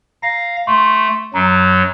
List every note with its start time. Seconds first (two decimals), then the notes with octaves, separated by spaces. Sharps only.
0.22 F5 A#5 A#6
0.67 A3 C6 C#6
1.34 F#2 F#3 A#5